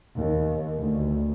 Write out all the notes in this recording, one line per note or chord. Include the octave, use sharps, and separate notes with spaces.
D#2
D2